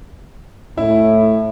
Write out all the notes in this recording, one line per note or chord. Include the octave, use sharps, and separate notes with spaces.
A2 E4